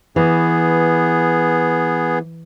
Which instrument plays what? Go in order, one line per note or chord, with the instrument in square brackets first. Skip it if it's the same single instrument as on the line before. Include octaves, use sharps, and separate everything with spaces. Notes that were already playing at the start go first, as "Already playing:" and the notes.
[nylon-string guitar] E3 [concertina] B3 G#4